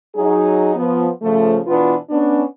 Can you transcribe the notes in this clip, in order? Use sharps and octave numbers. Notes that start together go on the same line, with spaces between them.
F#3 D#4 G#4
F3 B3
C#3 F3 A3
B2 E3 B3 D4 F4 B4
B3 C#4 D4